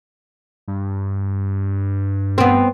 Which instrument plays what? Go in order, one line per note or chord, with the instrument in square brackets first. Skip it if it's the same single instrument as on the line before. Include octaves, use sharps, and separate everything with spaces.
[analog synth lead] G2
[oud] B3 C4